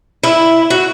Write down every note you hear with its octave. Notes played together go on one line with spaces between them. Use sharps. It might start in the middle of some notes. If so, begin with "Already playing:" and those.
E4
F#4